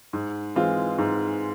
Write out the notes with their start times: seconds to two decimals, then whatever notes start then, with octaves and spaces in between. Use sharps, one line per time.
0.13 G#2
0.56 E3 G#3 C4 F4
0.98 G#2